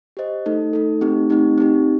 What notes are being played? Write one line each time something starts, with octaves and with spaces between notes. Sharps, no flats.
G4 C5 D#5
A3 D#4 A4
A3 D#4 A4
A3 C4 D#4 G4
A3 C4 D#4 G4
C4 D#4 G4